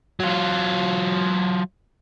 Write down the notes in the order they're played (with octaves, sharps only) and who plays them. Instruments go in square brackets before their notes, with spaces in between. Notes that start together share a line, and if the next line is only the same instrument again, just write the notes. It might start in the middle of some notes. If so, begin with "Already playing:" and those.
[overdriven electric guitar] F#3 F4